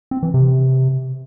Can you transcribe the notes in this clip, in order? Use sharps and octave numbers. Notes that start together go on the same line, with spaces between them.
C4
E3
C3